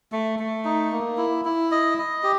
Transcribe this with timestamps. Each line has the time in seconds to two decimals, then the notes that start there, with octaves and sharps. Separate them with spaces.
0.12 A3
0.39 A3
0.65 D#4
0.92 A#3
1.18 E4
1.45 E4
1.72 D#5
1.98 D#5
2.23 G4